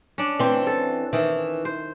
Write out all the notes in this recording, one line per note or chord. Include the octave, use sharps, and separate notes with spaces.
C#4 D4
E3 C4
A4
D#3 E3
C5